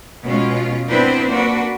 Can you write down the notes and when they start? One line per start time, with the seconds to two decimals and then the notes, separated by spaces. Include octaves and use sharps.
0.25 B2 G#3 C#4 F4
0.88 B3 C4 D4 E4 B4 C5
1.29 A#3 D4 F#4 B4